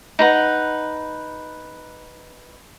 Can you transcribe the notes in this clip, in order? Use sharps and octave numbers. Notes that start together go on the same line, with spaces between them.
D#4 B4 F#5